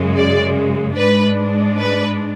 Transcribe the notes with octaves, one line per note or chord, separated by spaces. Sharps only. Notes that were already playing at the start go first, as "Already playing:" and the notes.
Already playing: F#2 C#3 G#3
D5
G#2 G#3 D4 B4
B4